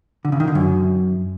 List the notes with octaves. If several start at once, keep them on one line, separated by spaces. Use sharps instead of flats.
D3
C#3
D#3
D3
F#2